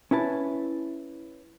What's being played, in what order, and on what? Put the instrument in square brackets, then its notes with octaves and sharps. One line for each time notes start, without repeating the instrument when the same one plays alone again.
[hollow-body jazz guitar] C#4 E4 B4 A5